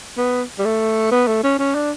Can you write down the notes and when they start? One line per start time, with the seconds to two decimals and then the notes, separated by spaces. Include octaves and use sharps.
0.17 B3
0.58 G3
0.65 A3
1.11 B3
1.27 A3
1.43 C#4
1.59 C#4
1.75 D4